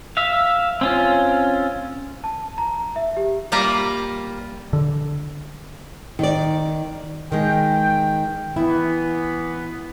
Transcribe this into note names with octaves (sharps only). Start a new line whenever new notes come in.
E5 F5
C4 C#4 F4
A5
A#5
E5
G4
G3 A#3 F4 G4 F5 A#5
D3
D#3 D5
D#3 G#3 G5
E3 B3 E4